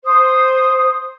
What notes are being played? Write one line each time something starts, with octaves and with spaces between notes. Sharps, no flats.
C5 D#6